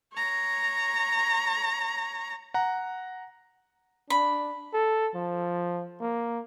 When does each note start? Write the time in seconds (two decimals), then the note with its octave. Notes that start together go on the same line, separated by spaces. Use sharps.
0.13 C#5 A#5
2.54 F#5 A#5
4.10 D4 B5
4.73 A4
5.15 F3
6.00 A#3